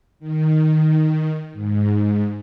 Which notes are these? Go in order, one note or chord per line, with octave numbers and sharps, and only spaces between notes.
D#3
G#2